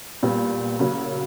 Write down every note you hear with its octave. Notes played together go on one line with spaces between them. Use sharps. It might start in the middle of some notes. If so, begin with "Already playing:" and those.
A#2 G3 B3
C#3 F#3 A#3